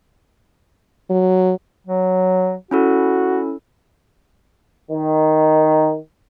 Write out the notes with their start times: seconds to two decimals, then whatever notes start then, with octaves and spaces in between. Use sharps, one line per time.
1.10 F#3
1.87 F#3
2.71 C#4 E4 F#4 A4
4.91 D#3